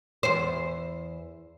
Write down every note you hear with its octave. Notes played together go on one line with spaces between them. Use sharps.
E2 C5